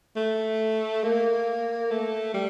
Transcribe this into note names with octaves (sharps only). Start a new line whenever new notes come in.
A3
A#3
A3
G3